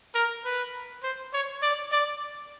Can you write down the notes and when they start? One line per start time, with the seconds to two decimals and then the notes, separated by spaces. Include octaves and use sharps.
0.14 A#4
0.45 B4
1.03 C5
1.33 C#5
1.62 D5
1.92 D5